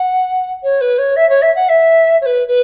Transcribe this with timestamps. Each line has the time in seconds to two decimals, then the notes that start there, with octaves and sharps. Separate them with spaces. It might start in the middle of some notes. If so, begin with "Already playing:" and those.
Already playing: F#5
0.63 C#5
0.80 B4
0.98 C#5
1.16 E5
1.29 C#5
1.41 E5
1.55 F#5
1.68 E5
2.21 C#5
2.25 B4
2.47 B4